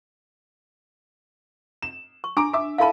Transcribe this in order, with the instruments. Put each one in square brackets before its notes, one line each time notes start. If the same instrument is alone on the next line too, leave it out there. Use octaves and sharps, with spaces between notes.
[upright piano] E7
[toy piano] C#6
[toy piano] D4 [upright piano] A#5 D6 D7
[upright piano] E5 D6
[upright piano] E4 A4 B5 [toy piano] F5 A5